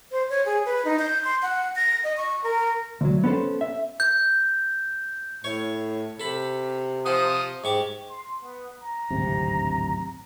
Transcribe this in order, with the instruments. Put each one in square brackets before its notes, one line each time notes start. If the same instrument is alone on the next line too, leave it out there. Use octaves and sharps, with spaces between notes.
[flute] C5
C#5
G#4
B4
D#4
G6
C6
F#5
A#6
D#5
C#6
A#4
[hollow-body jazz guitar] D2 F#3
B3 C#4 E4 A4 C5
E5
[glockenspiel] G6
[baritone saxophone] A2 [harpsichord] C#5 C#6
[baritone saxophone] C3 [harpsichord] A4 B5
[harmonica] F3 D#6 [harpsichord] C5 F#5
[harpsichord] G#2 C#6 D6 [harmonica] G4
[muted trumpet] C6
B3
A#5
[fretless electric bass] D1 G#1 C3